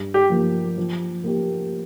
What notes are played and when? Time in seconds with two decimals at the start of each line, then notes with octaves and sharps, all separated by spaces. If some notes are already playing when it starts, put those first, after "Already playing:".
Already playing: G2
0.14 G4
0.30 F3 A#3
0.78 F3
1.24 A#3 G4